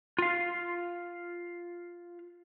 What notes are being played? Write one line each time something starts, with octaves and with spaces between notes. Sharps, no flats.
F4 F5